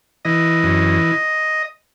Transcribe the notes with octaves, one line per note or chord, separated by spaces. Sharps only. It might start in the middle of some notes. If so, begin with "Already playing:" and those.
E3 D#5
F#2